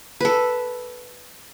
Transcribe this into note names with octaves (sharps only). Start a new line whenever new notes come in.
A4 B4